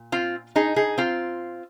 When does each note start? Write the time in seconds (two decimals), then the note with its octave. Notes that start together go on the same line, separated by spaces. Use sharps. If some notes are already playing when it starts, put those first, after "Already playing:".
Already playing: A#2
0.12 C4 F4
0.56 D#4 G#4
0.76 D#4 G#4
0.98 C4 F4